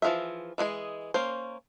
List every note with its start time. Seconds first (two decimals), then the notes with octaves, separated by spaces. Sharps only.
0.02 E3 F3 F4 G#4 E5
0.58 E3 G#3 G#4 D#5
1.14 A#3 C#4 C5